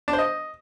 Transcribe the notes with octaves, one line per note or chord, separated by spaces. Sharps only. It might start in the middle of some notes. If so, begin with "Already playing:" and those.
D4
C5
D#5